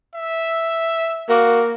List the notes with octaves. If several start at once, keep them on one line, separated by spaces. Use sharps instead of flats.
E5
A#3 F#4